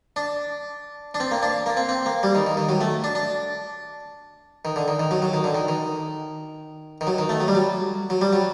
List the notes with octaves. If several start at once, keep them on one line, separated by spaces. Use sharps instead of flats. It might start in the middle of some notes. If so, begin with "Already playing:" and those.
D4
D4
C4
A#3
D4
A#3
C4
C4
A#3
G3
D#3
D#3
D#3
F#3
A3
D4
D4
D#3
D3
D#3
D#3
F#3
F#3
D#3
D3
D#3
D#3
D#3
F#3
D#3
A3
F#3
G3
F#3
F#3
G3
F#3